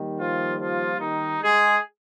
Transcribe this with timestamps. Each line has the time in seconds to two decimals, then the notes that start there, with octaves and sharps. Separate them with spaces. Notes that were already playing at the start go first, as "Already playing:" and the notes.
Already playing: D#2 D#3 G3
0.18 F3 F4
0.59 F3 F4
1.00 D#3 D#4
1.41 G#3 G#4